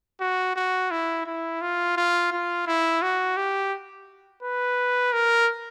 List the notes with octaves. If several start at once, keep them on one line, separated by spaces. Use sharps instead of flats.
F#4
F#4
E4
E4
F4
F4
F4
E4
F#4
G4
B4
A#4